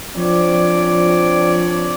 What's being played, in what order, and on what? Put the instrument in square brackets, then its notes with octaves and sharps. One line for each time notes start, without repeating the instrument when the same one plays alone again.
[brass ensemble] F3 C4 D4 C#5 D5